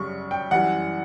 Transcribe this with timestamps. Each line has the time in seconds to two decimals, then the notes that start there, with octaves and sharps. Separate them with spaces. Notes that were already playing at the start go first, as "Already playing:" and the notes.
Already playing: F#2 C#3 G3 C#6
0.31 G5
0.51 F#2 E3 G3 F#5